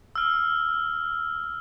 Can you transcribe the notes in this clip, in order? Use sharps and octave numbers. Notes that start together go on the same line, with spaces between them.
E6 F6